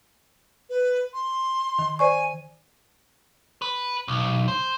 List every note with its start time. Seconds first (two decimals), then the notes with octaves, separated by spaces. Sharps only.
0.70 B4
1.13 C6
1.79 D#3
1.99 C5 D5 G#5 C#6
3.62 B4
4.08 B1
4.48 C5